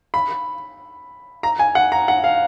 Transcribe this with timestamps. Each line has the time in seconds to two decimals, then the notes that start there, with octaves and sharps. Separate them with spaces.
0.14 B5
1.43 A#5
1.59 G#5
1.75 F#5
1.92 A#5
2.08 F#5
2.24 F5